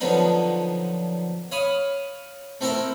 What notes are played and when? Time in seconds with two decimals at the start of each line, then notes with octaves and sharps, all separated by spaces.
0.01 D3 F3 F#3 B3 D4 D#4
1.52 C#5 F5 B5 D#6
2.61 A3 C4 E4 A4 A#4 G5